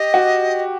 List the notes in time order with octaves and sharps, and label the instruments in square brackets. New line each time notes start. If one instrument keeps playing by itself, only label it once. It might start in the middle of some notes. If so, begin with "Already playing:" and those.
Already playing: [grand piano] G4 [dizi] D#5
[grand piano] F#4